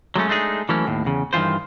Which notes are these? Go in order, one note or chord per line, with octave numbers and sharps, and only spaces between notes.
F#3 G#3 A3 C#4
G#3 A3 D4 D#4 G#4
E3 F#3 A3 A#3 C#4
D#2 A2
E2 C#3
G2 D#3 E3 F4 C5